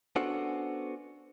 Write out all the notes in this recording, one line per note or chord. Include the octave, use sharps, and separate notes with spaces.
B3 C#4 D4 F#4 A4 C5